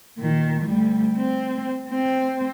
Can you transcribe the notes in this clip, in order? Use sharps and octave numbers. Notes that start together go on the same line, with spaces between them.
A#2 D#3
D2 G3
C4
C4